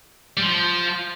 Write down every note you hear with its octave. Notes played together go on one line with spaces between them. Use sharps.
G3
F3